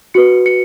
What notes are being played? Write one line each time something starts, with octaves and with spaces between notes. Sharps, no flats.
F#4 B4 C#7
C#7